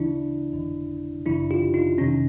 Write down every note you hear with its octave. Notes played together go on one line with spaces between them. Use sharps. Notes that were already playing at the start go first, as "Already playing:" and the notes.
Already playing: D2 C#3 E3 D4 E4
G1 F2 D3
G#1 F#2 C#3 E3 D4 E4
F4 G4
D#4 F4
F2 C3 D#3 C#4 D#4